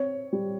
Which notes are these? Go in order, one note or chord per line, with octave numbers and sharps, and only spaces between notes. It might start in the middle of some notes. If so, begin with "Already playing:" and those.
Already playing: C4 C#5
G3